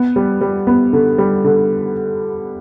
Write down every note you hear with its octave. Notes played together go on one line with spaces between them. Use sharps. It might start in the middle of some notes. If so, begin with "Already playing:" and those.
Already playing: B3
G3
G3
B3
D3
G3
D3